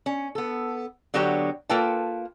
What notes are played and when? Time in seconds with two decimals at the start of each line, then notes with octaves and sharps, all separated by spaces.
0.06 C#4
0.35 B3 A4
1.14 D3 F#3 B3 F#4 G4 C#5
1.69 A#3 F4 A4 B4 G5 A5